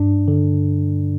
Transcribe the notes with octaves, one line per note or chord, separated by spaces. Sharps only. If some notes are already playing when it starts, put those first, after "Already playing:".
Already playing: G2 D4
D3